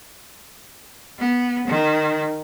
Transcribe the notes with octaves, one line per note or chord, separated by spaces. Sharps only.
B3
D#3